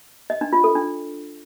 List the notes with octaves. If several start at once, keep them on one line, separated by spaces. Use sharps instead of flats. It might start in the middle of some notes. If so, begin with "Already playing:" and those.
D#5
D4
F4
A4
D4